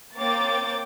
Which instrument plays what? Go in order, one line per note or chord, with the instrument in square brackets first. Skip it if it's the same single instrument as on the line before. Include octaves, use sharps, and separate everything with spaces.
[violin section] A#3 C4 C#5 G5 D6 A6